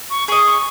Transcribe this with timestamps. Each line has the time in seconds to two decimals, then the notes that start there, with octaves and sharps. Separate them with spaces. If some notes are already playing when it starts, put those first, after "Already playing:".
0.10 C#6
0.28 G#4 D#5 C#6
0.46 C#6